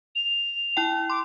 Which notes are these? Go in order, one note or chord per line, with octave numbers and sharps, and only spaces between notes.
F7
E4 G5
C6 D6